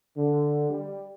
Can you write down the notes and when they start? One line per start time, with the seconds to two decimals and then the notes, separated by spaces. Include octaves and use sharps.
0.17 D3
0.69 G3